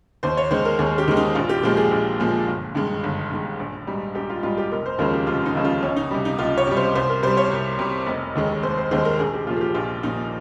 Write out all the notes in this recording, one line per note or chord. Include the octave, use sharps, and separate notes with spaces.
D#2 C5
C#5
D#3 G#3 C5
A#4
D#2 G#4
G4
D#3 G#3
D#4
A#1 F4
G4
A#2 F3 G#3 G4
G#4
A#1
A#2 F3 G#3
G1
G2 D#3 G#3
G1
G2 D#3 G#3
A#1
G#2 G3
A#1 G4
F4
G#2 G3 F4
G4
F1 A#4
C5
D#2 C#3 F3 G#3 A#4
G4
F1 F4
D#4
D#2 C#3 F3 G#3
F4
C#2 C#4
D#4
C3 G3
D#4
C#2 F4
C#5
C3 G3
C5
C2 C5
A#4
C3 G3 C5
C#5
C2
C3 G3
F1
D#2 D#3 G#3
F1 C5
C5
D#2 D#3 G#3 C5
A#4
A#1 G#4
G4
A#2 F3 F4
G#4
G4
A#1 F4
A#2 F3 D#4